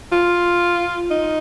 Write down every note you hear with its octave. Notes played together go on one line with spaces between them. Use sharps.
F4
D#4